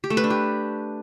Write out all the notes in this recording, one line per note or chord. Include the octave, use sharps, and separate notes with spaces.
G4
A3
B4
D4
G4